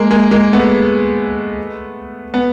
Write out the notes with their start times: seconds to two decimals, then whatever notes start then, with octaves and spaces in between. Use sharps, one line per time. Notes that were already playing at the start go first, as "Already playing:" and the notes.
Already playing: G#3 A#3
0.11 G#3 A#3
0.31 G#3 A#3
0.53 A3 B3
2.34 B3